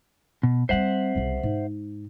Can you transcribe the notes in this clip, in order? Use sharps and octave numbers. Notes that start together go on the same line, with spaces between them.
B2
G3 C4 C5 E5 F#5
C2 C#3
G#2